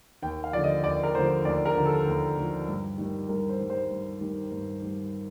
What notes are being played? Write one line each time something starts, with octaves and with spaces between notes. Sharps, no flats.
D#2 G5
F5
D3 F3 D5
D#5
D#2 D5
A#4
D3 F3 C5
D#2 D5
A#4
D3 F3
A4
D#2
D3 F3
G2
D#3 G3
G2 A#4
C5
D#3 G3
C5
G2
D#3 G3
G2
D#3 G3